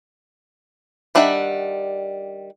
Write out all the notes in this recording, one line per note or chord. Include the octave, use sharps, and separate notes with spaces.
D#3 G3 D4 E5 F#5